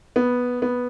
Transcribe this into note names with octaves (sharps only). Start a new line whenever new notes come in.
B3
B3